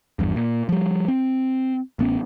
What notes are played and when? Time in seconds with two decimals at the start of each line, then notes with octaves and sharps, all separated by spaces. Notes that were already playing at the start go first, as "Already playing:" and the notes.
0.19 G#1 E2 G2
0.36 A#2
0.69 F3 G3
1.08 C4
1.99 A1 B3 C#4